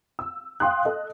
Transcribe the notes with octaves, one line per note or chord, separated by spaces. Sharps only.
E6
F5 G5 C6 D#6 F#6
A4 D#5